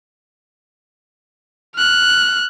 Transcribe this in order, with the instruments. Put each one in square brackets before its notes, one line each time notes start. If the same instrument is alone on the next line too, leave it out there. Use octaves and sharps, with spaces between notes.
[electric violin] F6 F#6